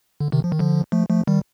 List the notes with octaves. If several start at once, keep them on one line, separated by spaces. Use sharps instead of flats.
D3
C3 D#3
F3
D#3
D3 F3
F3 A3
F3 A3
D#3 G3